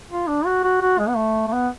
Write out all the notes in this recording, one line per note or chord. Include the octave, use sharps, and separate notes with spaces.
F4
D4
F#4
F#4
F#4
G#3
B3
A3
A3
B3